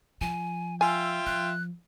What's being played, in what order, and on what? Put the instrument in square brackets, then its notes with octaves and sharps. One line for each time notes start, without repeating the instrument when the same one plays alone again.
[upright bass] F3 [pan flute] G#5
[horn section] F4 E5 G5 [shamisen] G#5 [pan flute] E6
[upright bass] F3 [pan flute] F#6